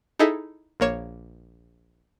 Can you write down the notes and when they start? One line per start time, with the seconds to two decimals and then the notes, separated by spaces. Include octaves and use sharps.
0.19 D#4 E4 G#4 A4 D#5 E5
0.80 A#1 A#3 C#5 E7